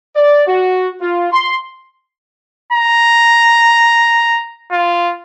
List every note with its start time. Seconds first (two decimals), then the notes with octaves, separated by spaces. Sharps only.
0.16 D5
0.47 F#4
1.01 F4
1.32 C6
2.72 A#5
4.71 F4